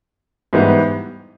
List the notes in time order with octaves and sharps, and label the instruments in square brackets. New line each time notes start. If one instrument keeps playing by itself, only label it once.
[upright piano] G#2 E3 G3 B3